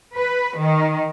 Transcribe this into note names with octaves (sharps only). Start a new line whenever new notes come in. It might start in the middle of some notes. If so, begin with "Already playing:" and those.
B4
D#3